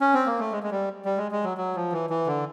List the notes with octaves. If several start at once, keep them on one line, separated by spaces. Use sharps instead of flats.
C#4
C4
A#3
A3
G#3
G#3
G3
G3
G#3
G#3
F#3
F#3
F3
E3
E3
D3